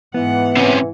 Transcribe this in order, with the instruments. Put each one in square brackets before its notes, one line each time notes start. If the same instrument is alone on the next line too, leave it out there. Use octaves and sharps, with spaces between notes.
[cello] G#2 F#5 [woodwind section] E3 [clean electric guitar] B3
[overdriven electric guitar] C3 C#4